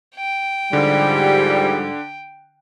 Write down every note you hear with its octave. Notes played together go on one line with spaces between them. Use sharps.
G5
G#2 D3 F3 G3